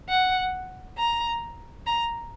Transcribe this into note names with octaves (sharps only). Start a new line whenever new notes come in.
F#5
A#5
A#5